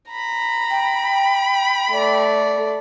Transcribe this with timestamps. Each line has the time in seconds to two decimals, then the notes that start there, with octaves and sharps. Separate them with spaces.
0.12 A#5 B5
0.70 G5
1.90 A3 D5